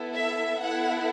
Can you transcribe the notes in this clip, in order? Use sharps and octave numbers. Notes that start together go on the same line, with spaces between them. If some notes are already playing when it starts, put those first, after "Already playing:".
Already playing: B3 E4 A4
E5
B3 E4 A4 F#5